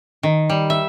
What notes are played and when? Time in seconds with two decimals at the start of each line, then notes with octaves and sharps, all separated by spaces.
0.23 D#3
0.50 G3
0.70 E5